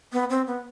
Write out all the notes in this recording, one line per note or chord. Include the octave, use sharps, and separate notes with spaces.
B3
C4
B3